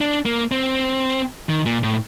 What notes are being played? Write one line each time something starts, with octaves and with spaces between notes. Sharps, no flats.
D4
A#3
C4
D#3
A#2
A2